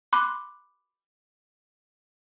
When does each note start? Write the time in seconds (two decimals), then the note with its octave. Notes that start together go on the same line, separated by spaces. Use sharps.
0.13 B5 C6 D6 F#6